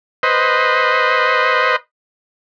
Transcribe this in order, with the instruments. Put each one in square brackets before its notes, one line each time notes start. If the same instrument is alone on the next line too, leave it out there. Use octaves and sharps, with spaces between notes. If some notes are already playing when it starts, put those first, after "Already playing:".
[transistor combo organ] B4 C5 D#5